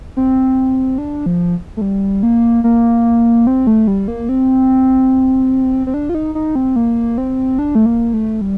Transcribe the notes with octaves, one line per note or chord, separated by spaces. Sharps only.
C4
D4
F3
A3
G3
A#3
A#3
C4
A3
G3
A#3
C4
C4
D4
F4
D#4
D#4
C4
A#3
C4
D4
A3
A#3
A3
G3